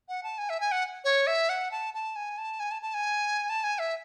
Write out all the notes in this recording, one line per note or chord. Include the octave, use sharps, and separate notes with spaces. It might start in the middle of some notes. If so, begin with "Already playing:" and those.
F#5
A5
G#5
E5
G#5
F#5
C#5
E5
F#5
A5
A5
G#5
A5
G#5
A5
A5
G#5
A5
G#5
E5